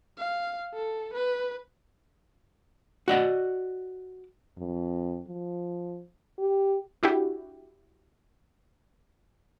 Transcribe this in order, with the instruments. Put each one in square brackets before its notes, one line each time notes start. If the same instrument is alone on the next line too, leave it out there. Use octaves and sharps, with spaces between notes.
[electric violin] F5
A4
B4
[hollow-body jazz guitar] F#4 D5 D#5 F#5
[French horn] F2
F3
G4
[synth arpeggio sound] D4 E4 F#4 G4